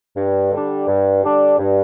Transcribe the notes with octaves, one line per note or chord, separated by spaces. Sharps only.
G2
D3 G3 D4
G2
D3 G3 D4
G2